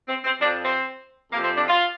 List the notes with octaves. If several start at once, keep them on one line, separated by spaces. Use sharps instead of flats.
C4
C4
F2 F3 D4
C4
F2 C3 F3 A#3
C4
D4
F4